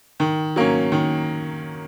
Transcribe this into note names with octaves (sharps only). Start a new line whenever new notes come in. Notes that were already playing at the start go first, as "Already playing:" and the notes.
D#3
F#3 A#3 C#4
D#3